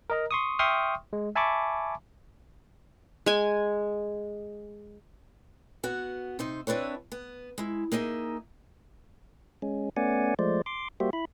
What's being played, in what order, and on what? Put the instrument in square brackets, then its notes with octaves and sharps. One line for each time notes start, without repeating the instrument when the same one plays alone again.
[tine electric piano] A#4 D#5 A#5
C6 C#6 D#6
E5 G5 C6 C#6 D#6 F6
G#3
E5 G#5 A5 B5 C#6 D6
[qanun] G#3 G#5
[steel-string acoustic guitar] B3 F#4
C3 D#4 C5
C4 D4 E4 B4 C#5
B3
G#3 E4
A#3 D#4 G#4 E5
[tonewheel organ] G#3 C#4
A3 B3 C#4 D5 F#5 G#5
F3 G#3 A3 C5 D5
C6 D6
G3 A#3 F#4 G4 C5 E5
E4 B5